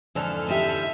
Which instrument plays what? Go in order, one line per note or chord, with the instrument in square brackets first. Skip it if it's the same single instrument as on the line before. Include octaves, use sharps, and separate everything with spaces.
[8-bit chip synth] F2 A4 F6 [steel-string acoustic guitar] G#2 D3 E3
[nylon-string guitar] G4 D#5 [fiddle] E5